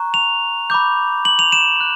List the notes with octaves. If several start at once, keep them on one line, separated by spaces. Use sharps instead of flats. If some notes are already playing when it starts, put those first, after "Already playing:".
Already playing: A#5 C#6 F#6
F7
B5 D6 G6
F#7
F7
E7
F#6